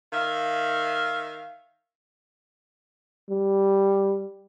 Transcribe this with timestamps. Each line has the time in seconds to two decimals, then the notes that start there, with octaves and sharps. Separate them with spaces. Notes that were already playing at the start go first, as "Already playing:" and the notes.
0.13 D#3 E5 F5
3.30 G3